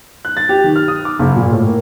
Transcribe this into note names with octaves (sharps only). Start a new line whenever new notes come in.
F#6
A6
G4
D#3
F6
D#6
D6
F#1
A#2
A2
A#3